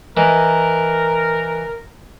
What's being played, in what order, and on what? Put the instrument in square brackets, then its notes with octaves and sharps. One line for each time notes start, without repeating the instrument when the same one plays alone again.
[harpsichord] E3 D#5 [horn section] A#4